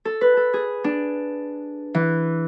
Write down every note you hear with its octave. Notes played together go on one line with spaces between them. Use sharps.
A4
B4
A4
G#4
D4
E3